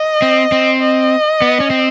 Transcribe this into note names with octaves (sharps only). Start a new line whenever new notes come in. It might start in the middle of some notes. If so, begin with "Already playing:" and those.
Already playing: D#5
C4
C4
D#5
B3
C#4
C4